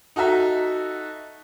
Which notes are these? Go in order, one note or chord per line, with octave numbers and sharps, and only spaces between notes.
D#4 F#4 A4 E5 A#5